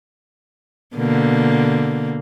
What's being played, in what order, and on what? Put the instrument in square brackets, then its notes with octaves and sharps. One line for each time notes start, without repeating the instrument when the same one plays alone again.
[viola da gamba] B2 D3 A#3